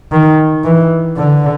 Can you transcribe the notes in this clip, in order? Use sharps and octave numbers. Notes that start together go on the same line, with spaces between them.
D#3
E3
D3